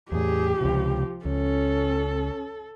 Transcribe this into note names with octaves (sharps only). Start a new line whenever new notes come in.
E2 A2 G4 G#4
C#2 C3 F3
C#2 C#4 A4